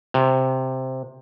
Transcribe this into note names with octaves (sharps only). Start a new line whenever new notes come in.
C3